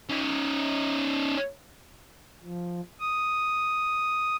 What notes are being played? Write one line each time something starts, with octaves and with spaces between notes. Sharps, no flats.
C#4 D#4
F3
D#6